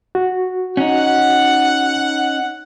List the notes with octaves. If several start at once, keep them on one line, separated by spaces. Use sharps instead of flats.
F#4
C#4 D#4 F#5